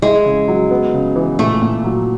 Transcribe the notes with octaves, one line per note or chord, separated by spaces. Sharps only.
G#3 E4
C#3
F#3
B3
C#3
E3
A#2 A3
A#2
F#3